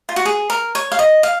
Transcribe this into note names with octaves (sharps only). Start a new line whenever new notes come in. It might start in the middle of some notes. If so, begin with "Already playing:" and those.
F4
F#4
G#4
A#4
C#5
F5
D#5
F5